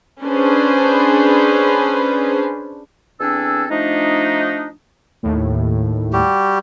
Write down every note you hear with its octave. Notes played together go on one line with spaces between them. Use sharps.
C#4 D4 G#4 B4 C5
E2 C4 D4 A4 G#5 E6
F3 A3 D4 D#4
D#2 A2
G3 F#4 G4